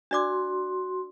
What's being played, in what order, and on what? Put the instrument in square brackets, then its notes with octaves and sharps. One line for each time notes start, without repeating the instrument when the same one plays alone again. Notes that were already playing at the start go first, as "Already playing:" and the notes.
[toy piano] D4 D5 D6 [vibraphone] F#4 C6